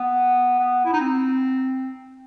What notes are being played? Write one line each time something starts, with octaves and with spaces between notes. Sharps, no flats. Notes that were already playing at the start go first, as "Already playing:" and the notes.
Already playing: B3
B3
E4
D#4
C4